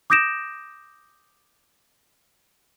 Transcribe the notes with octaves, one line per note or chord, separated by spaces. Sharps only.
D6 D#6 G6 A#6 D7 E7